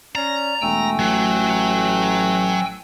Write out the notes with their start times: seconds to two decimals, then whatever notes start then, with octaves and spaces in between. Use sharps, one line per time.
0.15 C#4 D5 A#5
0.62 E1 A3 G5 G#5 E6
0.99 A1 F#3